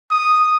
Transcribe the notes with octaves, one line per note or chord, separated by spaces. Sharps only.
D#6